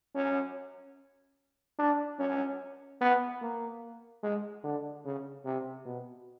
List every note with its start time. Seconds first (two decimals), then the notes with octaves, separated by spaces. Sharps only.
0.16 C#4
1.79 D4
2.19 C#4
3.01 B3
3.42 A#3
4.23 G#3
4.64 D3
5.05 C#3
5.45 C3
5.86 B2